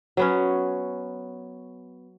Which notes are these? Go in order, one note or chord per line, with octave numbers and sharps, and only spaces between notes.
F#3 B3 C#4